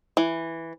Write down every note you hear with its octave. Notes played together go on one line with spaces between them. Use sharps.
E3